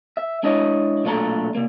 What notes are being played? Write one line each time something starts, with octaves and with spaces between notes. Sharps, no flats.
E5
G#3 D4 E4 C#5 D#5
B1 A#2 A3 D4 A4 A#5
C3 A#3